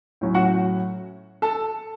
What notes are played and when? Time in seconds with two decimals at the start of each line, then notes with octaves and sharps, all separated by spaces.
0.21 A2 F#3 C#4
0.35 F#4 F#5
1.42 A4 A5